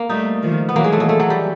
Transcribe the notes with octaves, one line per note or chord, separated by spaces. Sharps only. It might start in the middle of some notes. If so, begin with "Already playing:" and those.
Already playing: A#3
G3 A3 D#4
D#3 F3
B3
E3 F#3 A#3
G#3
A3
G#3
A3
F#3
G3